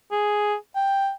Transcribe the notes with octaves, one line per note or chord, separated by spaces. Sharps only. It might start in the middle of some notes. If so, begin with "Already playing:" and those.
G#4
G5